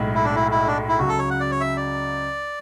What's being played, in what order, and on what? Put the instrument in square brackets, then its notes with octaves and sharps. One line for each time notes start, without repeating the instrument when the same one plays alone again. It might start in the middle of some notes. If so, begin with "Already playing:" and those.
Already playing: [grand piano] B1 A2 G#3
[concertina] E4
D4
E4
E4
D4
E4
[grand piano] C#2 C#3 F#3 [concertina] F#4
[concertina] A4
C#5
F#5
D5
C#5
E5
D5